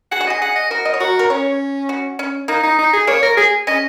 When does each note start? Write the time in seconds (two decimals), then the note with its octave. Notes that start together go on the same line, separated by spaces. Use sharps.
0.11 G#4 F#5
0.21 F#4
0.27 G#4 D#5
0.42 G#4 F#5
0.56 D#5
0.70 F#4 A#4
0.85 D#5
0.94 C#5
1.00 F#4 A#4
1.19 A#4
1.30 C#4 C#5
1.89 F#4
2.19 C#4
2.48 A#3 D#4
2.63 D#4
2.79 D#4
2.93 G#4
3.07 A#3 C#5
3.23 A#4
3.37 G#4
3.67 C#4 D#5